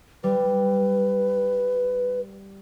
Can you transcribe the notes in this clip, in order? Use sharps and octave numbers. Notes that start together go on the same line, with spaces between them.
G3 B4